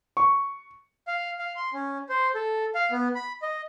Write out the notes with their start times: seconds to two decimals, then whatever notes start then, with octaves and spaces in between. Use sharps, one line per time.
0.17 C#6
1.07 F5
1.39 F5
1.56 C6
1.73 C#4
2.09 C5
2.35 A4
2.75 F5
2.91 B3
3.15 B5
3.42 D#5